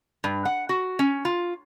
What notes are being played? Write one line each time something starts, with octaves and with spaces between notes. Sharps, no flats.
G2
F#5
F#4
C#4
F4